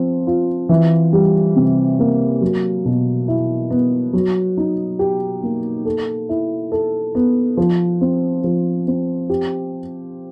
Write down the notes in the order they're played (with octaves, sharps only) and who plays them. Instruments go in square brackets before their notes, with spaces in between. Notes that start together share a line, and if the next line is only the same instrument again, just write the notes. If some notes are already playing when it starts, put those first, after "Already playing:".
Already playing: [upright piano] F3 C4
F4
E3
G3
C3
A#3
F#3
B2
E4
B3
F#3
D#4
G4
A#3
A4
E4
A4
B3
F3
C4
F3
C4
G4